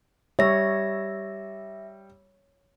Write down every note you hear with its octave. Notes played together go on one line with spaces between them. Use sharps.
G3 C#5 E5 E6 A#6